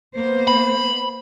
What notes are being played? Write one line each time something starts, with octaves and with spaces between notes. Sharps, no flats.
A#3 B3 C5
B5